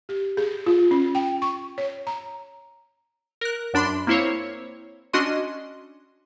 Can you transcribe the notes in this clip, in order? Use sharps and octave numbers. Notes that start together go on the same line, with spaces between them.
G4
G#4
F4
C#4
G5
C#6
C#5
A#5
A#4 F#6
F#2 D4 B5 C6
A#3 C4 E4 C5 C#5
C#4 D4 F#4 D#5 C6